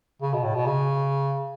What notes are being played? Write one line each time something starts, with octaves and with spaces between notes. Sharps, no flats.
C#3
B2
A2
B2
C#3